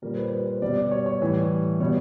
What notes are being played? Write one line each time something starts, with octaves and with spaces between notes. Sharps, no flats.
A#2 G3 A#4
C5
B4
B4
C5
B2 G3 D5
D5
C#5
C#5
A2 E3 G3
B2 G3 C#5